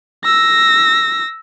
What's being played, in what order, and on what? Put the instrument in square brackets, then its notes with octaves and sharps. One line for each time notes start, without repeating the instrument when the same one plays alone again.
[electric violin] E6 A#6